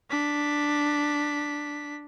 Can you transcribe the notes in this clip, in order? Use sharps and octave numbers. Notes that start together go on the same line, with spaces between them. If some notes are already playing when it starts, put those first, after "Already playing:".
D4 B6